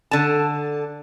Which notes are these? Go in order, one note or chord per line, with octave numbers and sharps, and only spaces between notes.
D3 A5